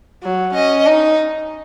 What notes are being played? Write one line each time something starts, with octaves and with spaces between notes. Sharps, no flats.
F#3
C#4 D#5
D#4